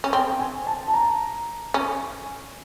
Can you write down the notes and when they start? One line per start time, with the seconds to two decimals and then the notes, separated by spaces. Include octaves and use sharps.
0.04 C#4
0.13 C4 G5
0.39 G#5
0.67 A5
0.88 A5
0.94 A#5
1.74 C#4